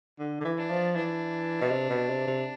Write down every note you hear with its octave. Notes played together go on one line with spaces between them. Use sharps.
D3
D3
E3
D4
F3
E3 D4
B2
C3
B2
C3
C3